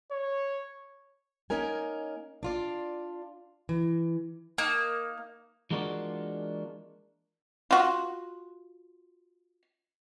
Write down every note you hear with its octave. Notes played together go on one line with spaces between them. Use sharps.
C#5
A#3 C#4 D#4 A#4 G#5
D4 F4 D5
E3
A#3 D#4
E3 G#3 A#3 D4 F4 F#4
F4 F#4